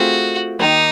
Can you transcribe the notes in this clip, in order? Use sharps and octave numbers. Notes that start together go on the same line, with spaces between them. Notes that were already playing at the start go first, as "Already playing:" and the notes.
Already playing: A3 C4 F4 F#4 G#4
D#3 G3 A#3 D#4